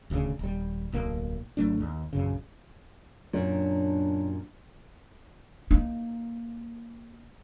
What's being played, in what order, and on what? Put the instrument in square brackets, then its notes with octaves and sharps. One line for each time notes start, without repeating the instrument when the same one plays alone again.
[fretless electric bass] D#1 D2 G#2 C#3
D#1 G3
D1 B1 A#3
G#1 F#3 A3 D4
D#2
A#1 F#2 C#3
[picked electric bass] F#2 A#2 [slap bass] F#3 [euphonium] D4
[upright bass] A#3 D#4